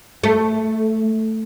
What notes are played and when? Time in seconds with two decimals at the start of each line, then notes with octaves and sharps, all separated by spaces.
0.24 A3